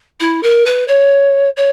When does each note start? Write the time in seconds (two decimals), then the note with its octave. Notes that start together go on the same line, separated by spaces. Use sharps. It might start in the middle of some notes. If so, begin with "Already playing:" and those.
0.20 E4
0.43 A#4
0.66 B4
0.88 C#5
1.57 C#5